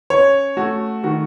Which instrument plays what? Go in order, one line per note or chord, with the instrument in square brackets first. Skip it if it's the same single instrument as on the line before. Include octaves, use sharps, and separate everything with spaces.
[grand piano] C#4 C#5
A3 F#4
D#3 F#4